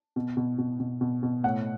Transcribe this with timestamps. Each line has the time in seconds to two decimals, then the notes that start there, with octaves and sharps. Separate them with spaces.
0.16 B2
0.37 B2
0.58 B2
0.80 B2
1.01 B2
1.23 B2
1.44 A2 F#5